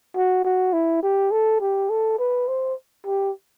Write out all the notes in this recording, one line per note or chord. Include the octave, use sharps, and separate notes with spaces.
F#4
F#4
E4
G4
A4
G4
A4
B4
C5
G4